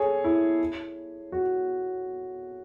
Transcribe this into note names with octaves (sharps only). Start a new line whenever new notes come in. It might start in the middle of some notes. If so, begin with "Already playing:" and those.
Already playing: G#4 A4 C#5
E4
F#4